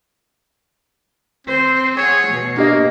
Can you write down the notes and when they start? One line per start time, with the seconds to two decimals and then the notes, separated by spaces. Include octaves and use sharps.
1.47 C4 C5
1.97 G#4 C#5 F#5
2.28 B2
2.57 A#3 D4 G4 D#5